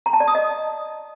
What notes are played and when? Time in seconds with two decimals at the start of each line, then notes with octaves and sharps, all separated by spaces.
0.06 A#5
0.13 A5
0.20 D5
0.28 D#6
0.35 D#5